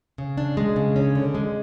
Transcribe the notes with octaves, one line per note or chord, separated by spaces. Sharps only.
C#3
D4
G#3
C#3
C#4
D3
G#3